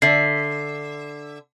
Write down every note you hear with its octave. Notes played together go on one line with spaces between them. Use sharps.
D3 E5 C7